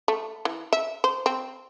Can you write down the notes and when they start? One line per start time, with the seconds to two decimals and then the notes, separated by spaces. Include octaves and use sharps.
0.08 A3
0.45 E3
0.73 E5
1.04 C5
1.26 C4